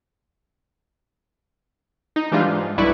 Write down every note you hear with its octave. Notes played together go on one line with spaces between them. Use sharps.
D#4
E3 G3 G#3 D4 F4
G#2
B1 G2 E4 B4 D5 C#6